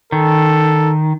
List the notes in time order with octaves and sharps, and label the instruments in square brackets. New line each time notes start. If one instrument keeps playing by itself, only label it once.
[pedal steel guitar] D#3 [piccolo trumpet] A4